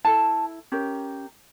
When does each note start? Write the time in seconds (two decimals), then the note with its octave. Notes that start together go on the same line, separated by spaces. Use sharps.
0.05 E4 A4 A5
0.72 C#4 G4 A#4